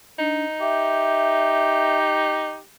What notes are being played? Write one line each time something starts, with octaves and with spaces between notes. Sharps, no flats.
D4 D#4
G4 E5